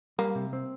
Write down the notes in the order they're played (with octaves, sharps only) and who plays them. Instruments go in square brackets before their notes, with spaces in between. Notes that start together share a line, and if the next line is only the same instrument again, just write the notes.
[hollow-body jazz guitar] G3 [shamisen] A#3
[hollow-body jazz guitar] C3
C4